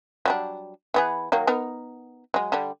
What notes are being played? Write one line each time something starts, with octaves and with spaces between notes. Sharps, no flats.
F#3 G3 D4
E3 B3 G#4
D#3 F#3 A#3
B3 D#4 A#4
F#3 G#3
D3 G3